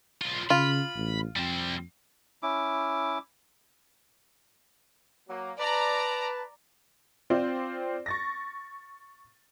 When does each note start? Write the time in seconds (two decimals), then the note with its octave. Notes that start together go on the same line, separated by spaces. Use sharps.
0.22 B1 F4
0.50 C#3 F4 B5
0.95 A1
1.36 F2 G3 C4
2.43 C#4 E4 D6
5.29 F#3 A#3
5.60 B4 D5 A5 A#5
7.30 C4 F4 C5 D5
8.06 C#6 A6 A#6